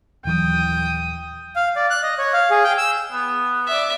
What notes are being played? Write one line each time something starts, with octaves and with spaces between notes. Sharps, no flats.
D#1 E3 F#3 G5 D#6
F5
D5
F#6
D#5
C#5
F5
G#4
G5
E6
B3
D5 E5